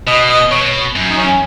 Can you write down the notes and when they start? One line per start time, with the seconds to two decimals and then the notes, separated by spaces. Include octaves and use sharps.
0.07 B2 D#5
0.30 D#5
0.51 B2 C#5
0.96 F#2
1.10 D#4
1.16 C#4